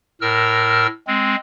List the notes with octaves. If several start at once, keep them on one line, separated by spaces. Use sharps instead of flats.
A2 A#4 E6 F6
G#3 C4